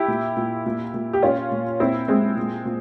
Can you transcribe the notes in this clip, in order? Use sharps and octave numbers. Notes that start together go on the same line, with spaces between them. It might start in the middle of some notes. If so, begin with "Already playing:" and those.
Already playing: E4 G4
A#2
A#2
A#2
A#2
G4
A#2 C#4 F4
A#2
A#2 C4 E4
A#2 G#3 C4
A#2
A#2